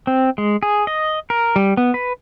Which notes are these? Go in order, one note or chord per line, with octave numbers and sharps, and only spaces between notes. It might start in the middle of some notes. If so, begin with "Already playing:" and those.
C4
G#3
G#4
D#5
A#4
G3
B3
B4